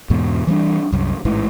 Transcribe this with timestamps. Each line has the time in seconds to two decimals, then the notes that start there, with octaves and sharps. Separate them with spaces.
0.10 E2 G#2 B2
0.47 E3 G3 C#4 D4
0.92 C2 F#2
1.25 A1 G#2 E3